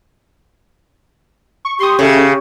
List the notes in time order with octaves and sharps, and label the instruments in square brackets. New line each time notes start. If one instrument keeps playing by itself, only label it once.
[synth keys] C#6
[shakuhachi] G4 [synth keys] C6 C#6 D#6
[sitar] C#3 [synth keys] C#4 A4 E5